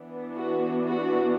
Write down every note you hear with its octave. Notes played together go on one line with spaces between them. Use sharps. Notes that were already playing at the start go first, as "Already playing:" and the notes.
Already playing: E3 B3 D4
F#4
F#4